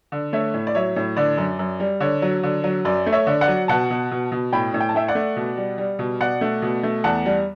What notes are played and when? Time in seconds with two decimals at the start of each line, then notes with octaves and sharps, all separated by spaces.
0.12 D3
0.33 A3 C#5 E5
0.54 A2
0.67 D5
0.75 F#3 C#5 E5
0.96 A2
1.17 D3 D5
1.37 F#2
1.59 F#2
1.80 G3
2.00 D3 C#5
2.22 F#3
2.43 D3
2.64 F#3
2.85 F#2 D5
3.06 A3
3.12 C#5 E5
3.27 D3
3.41 D5 F#5
3.48 F#3
3.68 B2 F#5 A5
3.90 B2
4.11 B2
4.32 B2
4.53 A2 G5 B5
4.74 A2
4.80 G5
4.89 A5
4.94 A3 E5 G5
5.08 D5 F#5
5.15 A3
5.36 B2
5.57 G3
5.78 G3
5.99 B2
6.21 B2 D5 F#5
6.41 A3
6.62 B2
6.83 A3
7.04 E2 F#5 A5
7.26 G3